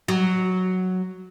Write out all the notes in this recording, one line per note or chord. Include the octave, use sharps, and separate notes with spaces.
F#3